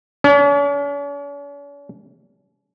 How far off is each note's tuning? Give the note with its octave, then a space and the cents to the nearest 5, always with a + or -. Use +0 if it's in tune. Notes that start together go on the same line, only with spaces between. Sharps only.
C#4 +45